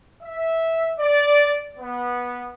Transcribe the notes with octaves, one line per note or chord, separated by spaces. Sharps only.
E5
D5
B3